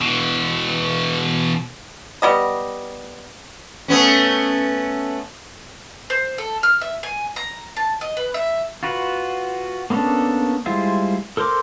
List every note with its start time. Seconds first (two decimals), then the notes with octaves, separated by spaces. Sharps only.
0.01 B2 E3
2.22 G3 B3 D#5
3.88 A3 B3 C#4
6.10 C5
6.38 A4
6.63 F6
6.81 E5
7.03 G#5
7.36 A#5
7.77 A5
8.01 D#5
8.17 B4
8.34 E5
8.83 F4 F#4 B4
9.90 A#3 B3 C#4 D4 A4
10.66 G3 G#3 E4 F4 C5
11.37 A4 A#4 C5 C6 D6